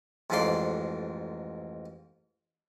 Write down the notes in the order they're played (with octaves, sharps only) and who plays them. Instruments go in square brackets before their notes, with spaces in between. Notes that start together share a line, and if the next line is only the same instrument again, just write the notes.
[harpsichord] A1 F2 G#2 D4 D5 C6